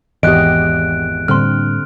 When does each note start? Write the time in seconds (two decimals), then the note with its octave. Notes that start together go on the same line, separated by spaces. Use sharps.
0.23 G#1 E2 E3 G4 D#5 F#6 D7
1.28 A2 D3 G3 A#3 C4 C6 F6